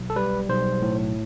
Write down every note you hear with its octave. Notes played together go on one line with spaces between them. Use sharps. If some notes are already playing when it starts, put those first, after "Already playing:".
Already playing: B1
A4
G3 B4
B1 C5
A2